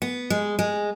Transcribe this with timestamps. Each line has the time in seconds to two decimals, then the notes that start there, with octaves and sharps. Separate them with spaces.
0.02 B3
0.30 G#3
0.59 G#3